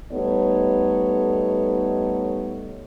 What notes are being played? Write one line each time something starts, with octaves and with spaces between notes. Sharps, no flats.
G3 A3 B3 D#4 A4 C#5